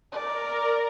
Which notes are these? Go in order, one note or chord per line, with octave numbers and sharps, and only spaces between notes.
A#4 D5